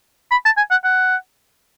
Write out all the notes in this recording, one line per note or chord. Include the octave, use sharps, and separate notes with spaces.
B5
A5
G#5
F#5
F#5